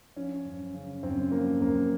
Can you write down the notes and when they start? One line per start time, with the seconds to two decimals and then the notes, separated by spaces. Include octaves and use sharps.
0.16 F3 C#4
0.45 F#2
0.74 C#3
1.03 F#2 C4
1.31 F3 A#3
1.61 F#2 A#3